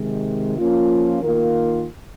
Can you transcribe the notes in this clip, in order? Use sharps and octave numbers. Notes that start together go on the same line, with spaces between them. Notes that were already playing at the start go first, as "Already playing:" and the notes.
Already playing: C3 D#3 G#3
F3 A#3 C#4 F4
D#3 A#3 F4 A#4